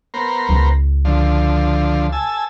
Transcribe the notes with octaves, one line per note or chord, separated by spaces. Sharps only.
B3 A#4 C5
C#2
D3 F3
G#5 A5 E6